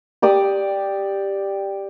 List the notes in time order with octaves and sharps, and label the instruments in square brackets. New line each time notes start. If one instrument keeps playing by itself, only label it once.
[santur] G4 D5 D6 D#6